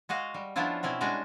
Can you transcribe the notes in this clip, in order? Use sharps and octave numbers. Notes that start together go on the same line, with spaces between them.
G#3 F#4 D#5 F5
G3
F3 B3 C#4 D4 E4 F4
B2 C4 C#4 E4
G3 G#3 C#4 D4 F#4